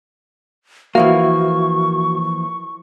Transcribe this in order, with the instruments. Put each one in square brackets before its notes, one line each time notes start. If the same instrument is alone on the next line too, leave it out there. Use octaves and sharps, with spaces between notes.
[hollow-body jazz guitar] E3 F3 A#3 [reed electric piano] F#4 E5 [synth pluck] F5 [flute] C#6